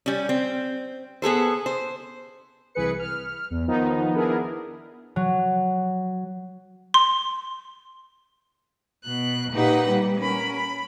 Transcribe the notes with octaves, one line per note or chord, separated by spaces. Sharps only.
G3 C#4
C4
B3 G#4 A4 C5
C5
C2 E3 G#4 B4 C#7
F6
E2
D#3 F3 B3 D#4
B3 D4 E4 G#4 A#4
F#3
C6
B2 F#6
A#2 D#4 G4 B4 F#5
G3
C#4 A#4 B5
B5